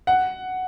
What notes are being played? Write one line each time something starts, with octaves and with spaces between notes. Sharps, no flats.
F#5